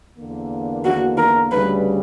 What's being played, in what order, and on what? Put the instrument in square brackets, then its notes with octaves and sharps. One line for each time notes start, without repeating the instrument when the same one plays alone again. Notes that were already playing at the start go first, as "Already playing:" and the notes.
[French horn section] E2 D3 A#3
[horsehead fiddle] F#4
A#4
[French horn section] D2 C#3 G3 [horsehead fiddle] B4